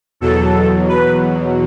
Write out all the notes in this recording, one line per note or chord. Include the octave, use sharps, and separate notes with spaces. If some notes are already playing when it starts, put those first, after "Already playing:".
E2 B2 F#3 A4
B4